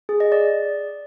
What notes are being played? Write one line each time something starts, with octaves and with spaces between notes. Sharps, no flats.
G#4
D#5
D5